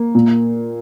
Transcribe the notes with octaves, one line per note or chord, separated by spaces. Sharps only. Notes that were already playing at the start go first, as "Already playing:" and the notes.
Already playing: A#3
A#2